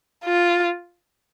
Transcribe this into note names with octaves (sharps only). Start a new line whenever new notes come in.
F4